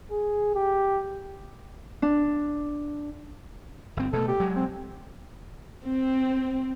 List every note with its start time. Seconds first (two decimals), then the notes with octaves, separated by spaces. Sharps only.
0.11 G#4
0.55 G4
2.02 D4
3.97 G1 C4
4.13 B2 A3 A4
4.28 G4
4.40 F#3 G#3
4.56 C4
5.86 C4